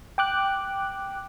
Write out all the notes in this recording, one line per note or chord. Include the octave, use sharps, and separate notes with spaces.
G5 D6 F#6